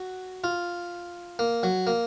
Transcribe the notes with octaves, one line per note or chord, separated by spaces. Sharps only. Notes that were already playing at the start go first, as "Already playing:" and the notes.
Already playing: F#4
F4
A#3
F#3
A#3